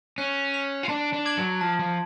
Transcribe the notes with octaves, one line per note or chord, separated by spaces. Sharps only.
C#4 F#6
B6 F7
F4
D4 A5
D4
D6 G#6 D7 F#7
F#3
F3 A5
F3